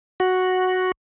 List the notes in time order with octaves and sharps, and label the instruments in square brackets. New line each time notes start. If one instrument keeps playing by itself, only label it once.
[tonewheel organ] F#4